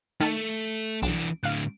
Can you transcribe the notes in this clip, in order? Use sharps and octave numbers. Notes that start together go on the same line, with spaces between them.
D#3 A3 A5 D#7
B1 E3 D4
A2 D3 F5 F#6